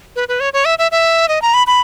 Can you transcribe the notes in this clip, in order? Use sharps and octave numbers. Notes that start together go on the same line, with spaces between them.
B4
B4
C#5
C#5
E5
E5
E5
D#5
A#5
B5
B5